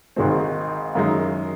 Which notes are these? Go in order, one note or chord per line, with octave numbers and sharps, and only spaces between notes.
G#1 G#2 D#3 G#3 C4
F#2 D#3 G#3 D#4